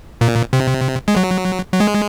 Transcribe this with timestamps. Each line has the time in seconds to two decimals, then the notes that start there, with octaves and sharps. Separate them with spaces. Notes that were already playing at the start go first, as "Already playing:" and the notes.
0.21 A#2
0.53 C3
1.08 G#3
1.16 F#3
1.73 F#3
1.80 G#3